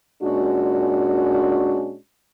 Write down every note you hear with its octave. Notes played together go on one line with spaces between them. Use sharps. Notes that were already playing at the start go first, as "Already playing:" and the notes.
A#2 G#3 C#4 D4 F#4